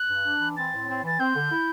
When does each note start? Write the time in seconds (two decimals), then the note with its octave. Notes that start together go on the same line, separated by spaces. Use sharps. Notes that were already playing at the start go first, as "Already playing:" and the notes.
Already playing: F#6
0.09 G2
0.25 D4
0.40 E3
0.57 C4 A6
0.73 A2
0.89 C4
1.04 E3 A6
1.19 C4 G6
1.35 D3
1.51 E4